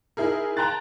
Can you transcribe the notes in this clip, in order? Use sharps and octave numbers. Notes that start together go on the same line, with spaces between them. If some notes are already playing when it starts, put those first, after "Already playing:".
D#4 E4 G#4 A#4
G5 A5 A#5 C6 F#6 A6